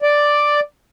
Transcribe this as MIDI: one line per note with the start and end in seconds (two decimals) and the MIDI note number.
0.02 0.60 74